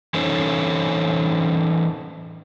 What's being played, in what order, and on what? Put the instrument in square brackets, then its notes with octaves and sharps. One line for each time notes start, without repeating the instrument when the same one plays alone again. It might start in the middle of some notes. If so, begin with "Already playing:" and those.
[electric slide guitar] E3 C#4 D#4 A4 C5 C#5